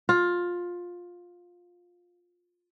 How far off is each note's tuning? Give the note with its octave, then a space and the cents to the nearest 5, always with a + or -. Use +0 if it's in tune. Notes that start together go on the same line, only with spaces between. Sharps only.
F4 +15